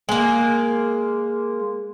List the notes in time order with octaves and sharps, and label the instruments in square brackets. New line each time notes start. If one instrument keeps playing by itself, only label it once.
[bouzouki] G#3 A#3